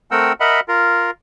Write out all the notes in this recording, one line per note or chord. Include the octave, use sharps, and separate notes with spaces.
A3 C4 A#4 F#5 G5 E6
A#4 D#5 E5 F#5 B5
F4 A#4